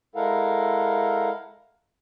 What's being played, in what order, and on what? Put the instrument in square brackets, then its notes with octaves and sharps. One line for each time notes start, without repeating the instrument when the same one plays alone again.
[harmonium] G#3 E4 A4 A#4 F5 F#5